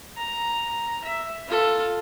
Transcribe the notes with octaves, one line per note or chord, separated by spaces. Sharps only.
A#5
E5
F4 A4